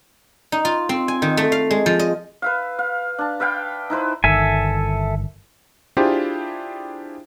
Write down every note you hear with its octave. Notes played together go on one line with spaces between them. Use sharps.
D#4
F4
C4
G#5
D#3
A3
F5
G#3
F3
D#5
B4 E5 F5
F5
D4 A5
B4 E5 F5 G5
D#4 E4 B4 C5
G1 D#3 A4 E5 G#5
D4 E4 F4 G4 G#4 C5